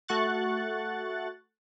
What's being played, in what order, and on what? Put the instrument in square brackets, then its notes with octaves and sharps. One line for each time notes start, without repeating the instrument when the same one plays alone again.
[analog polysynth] A3 F#4 C#6 F#6 A6